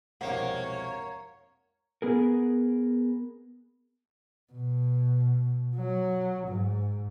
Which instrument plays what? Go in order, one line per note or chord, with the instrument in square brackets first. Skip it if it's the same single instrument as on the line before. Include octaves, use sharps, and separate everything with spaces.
[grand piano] E1 C2 F2 [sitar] A#3 [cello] C#5 [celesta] F#5
[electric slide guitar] B3 G#4 A#4
[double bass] B2
F#3
G#2